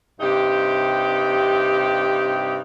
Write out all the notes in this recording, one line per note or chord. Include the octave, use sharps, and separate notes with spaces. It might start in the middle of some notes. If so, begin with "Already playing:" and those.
G2 C3 D#4 G4